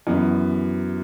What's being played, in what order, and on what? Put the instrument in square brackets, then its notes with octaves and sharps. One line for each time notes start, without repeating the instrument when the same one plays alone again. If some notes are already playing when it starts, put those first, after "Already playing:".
[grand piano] F#2 E3 B3